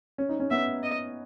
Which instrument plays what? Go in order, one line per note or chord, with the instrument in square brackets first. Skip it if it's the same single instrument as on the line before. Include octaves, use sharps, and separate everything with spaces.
[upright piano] C#4
D#4
C#4
[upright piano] B3 [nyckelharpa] E5
[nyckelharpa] D#5